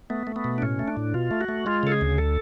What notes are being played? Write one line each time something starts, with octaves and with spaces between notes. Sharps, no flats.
A3 B3
A3
B3
B2
D4
A2 C#4
A3
D4
A2
B2 F4
A3
F#4
A3
G#3 F4
C#3 A4
G#4
D2
A4